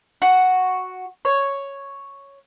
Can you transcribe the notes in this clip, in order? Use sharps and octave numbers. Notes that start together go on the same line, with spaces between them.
F#4
C#5